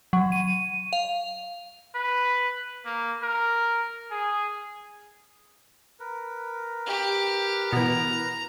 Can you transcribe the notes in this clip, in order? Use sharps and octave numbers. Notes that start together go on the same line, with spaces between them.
F#3
D#7
F5
B4
A#3
A#4
G#4
A#4 B4
G4
B2 E3 A#5